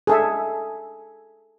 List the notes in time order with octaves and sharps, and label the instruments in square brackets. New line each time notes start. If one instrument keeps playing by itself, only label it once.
[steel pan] G#4 A4 E5